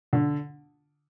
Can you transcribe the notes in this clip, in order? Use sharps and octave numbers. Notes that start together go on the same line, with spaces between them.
D3